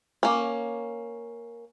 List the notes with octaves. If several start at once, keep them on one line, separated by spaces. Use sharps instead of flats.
A#3 C#4